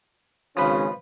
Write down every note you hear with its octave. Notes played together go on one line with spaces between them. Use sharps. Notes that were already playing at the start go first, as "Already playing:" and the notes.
G#1 C#3 F3 B4